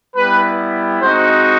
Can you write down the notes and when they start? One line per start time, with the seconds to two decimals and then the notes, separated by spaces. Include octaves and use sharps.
0.16 G3 B3 E4 B4
1.01 G#3 C4 D#4 F#4 C5